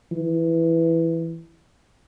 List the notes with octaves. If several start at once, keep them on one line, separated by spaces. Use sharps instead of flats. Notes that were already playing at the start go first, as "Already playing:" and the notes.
E3